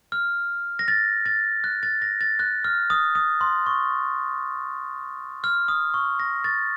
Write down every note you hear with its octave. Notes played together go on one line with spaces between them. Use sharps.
F6
A#6
A6
A6
F#6
A6
A#6
A6
F#6
F6
D#6
D#6
C6
C#6
F6
D#6
C#6
A#6
A6